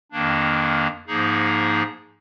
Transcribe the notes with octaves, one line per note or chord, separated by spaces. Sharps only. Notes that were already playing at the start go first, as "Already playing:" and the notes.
F2 D#3 A#3 D4
G#2 F3 A#3 D#4 G#4